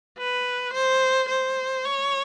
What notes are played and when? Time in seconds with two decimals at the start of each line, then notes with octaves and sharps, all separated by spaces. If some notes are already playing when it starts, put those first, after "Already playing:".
0.18 B4
0.73 C5
1.29 C5
1.85 C#5